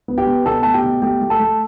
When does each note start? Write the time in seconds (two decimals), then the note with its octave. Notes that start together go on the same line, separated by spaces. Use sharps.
0.08 B3
0.18 G4 G5
0.27 B3
0.45 B2 A4 A5
0.63 A3 A5
0.74 G4 G5
0.83 B2
1.02 A3 G4 G5
1.21 A3
1.30 A4 A5
1.40 A3